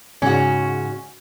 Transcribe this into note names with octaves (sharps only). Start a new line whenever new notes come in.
G#2 C#3 C#4 F#4